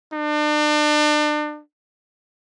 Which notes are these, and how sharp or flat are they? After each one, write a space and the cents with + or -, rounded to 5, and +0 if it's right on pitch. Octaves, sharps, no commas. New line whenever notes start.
D4 +35